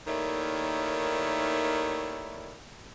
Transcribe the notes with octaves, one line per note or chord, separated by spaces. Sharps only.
D#2 D#3 A3 E4 C#5 D5